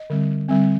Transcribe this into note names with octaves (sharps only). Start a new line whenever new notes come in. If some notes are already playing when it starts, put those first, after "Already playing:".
Already playing: D#5
D3 G3 C4
D3 G3 C4